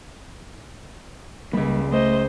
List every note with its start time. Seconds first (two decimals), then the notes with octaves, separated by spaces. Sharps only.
1.53 C#2 G3 A#3 B5
1.92 A3 C5 D#5